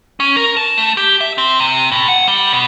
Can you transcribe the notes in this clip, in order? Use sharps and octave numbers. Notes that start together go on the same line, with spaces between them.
C#4
A#4
A5
A3
G4
E5
C4
C3
A2
F#5
G3
B2